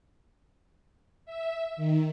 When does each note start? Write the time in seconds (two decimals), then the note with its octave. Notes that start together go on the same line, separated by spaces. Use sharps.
1.25 E5
1.76 D#3